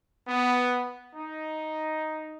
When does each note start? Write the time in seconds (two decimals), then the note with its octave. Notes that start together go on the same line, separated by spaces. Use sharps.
0.28 B3
1.15 D#4